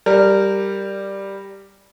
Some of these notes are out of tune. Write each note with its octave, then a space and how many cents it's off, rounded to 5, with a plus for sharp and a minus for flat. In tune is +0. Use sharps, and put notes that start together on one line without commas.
G3 +0 A#4 -15